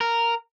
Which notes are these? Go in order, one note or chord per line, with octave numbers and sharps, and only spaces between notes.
A#4